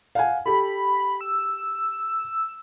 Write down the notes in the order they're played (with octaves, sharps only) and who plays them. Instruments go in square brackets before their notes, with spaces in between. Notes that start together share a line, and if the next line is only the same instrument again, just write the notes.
[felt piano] F5 F#5 G#5
[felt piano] G4 A4 [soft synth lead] B5
[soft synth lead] E6